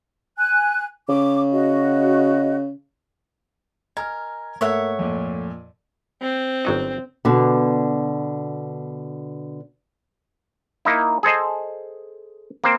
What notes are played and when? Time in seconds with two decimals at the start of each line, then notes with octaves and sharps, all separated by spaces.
0.38 G#5 F#6
1.09 C#3 D6
1.52 F#4 D#5
3.97 A#4 D#5 G#5 F6 G#6
4.61 G#2 A3 A#3 A4 C#5 E5 F#5
4.99 F2 A#2
6.22 C4
6.65 G1 F#3 D#4
7.25 B2 D3
10.85 A#3 D#4 E4
11.23 G#4 A4 C5 D#5
12.64 A#3 C4 C5